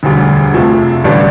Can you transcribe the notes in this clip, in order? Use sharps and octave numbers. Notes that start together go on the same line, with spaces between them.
E1 D2 D3 G3
F2 C3 F3 A3
A1 G2 D3 G3 D4